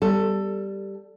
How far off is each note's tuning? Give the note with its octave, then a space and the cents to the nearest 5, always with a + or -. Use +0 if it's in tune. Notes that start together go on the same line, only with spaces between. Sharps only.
G3 +0 A4 +15